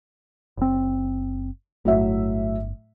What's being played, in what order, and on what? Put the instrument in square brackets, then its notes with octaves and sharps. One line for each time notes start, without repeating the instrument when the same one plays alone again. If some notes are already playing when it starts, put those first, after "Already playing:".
[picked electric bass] F#1 C4
[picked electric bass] G1 [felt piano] A2 F#3 E5